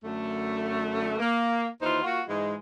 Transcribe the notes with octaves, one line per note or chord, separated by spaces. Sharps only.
F#2 D3 A3
A#3
D#2 E3 D#4 F4 C5
A#3 F4 F#4
G#2 E3 G#3